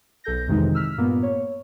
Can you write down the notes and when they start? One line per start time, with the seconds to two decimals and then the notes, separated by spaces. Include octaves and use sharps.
0.24 B1 A4 G6 A#6
0.48 F2 C3 D#3 E3 G#3 D#4
0.75 E6 F6 B6
0.97 G2 A#2 A#3 B3
1.23 C#5